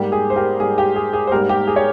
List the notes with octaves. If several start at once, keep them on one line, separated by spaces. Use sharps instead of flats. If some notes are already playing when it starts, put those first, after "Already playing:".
Already playing: G#2 G3 A#3 G4
G#4
C5
G4 A#4
G#2 G3 A#3 G#4
G4
G#4
G#4
C5
G#2 G3 A#3 G4 A#4
G4
G#4
C#5